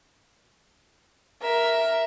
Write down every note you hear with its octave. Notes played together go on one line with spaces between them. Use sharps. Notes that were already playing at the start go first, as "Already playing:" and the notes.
A#4 E5